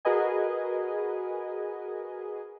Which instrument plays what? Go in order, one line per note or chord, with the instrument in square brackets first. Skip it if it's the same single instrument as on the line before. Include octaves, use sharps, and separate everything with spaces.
[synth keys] F#4 G#4 A#4 B4 D#5 G#5